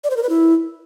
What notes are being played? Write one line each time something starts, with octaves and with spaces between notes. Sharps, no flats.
D5
C5
A#4
B4
E4